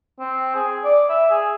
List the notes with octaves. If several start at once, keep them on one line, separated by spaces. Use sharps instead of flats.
C4
G#4
D5
E5
G#4